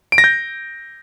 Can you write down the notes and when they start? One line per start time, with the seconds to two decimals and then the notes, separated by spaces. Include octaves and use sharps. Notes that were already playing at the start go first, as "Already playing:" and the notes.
0.12 D7
0.18 A#6
0.24 G6